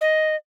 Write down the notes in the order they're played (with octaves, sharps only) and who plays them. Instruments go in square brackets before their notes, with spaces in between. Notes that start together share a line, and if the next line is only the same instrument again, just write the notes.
[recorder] D#5